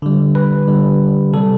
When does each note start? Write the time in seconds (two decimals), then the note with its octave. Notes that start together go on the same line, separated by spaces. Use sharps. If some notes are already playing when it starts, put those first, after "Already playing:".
0.02 D3 G3
0.35 B4
0.68 D3 G3
1.33 C3 G3 A4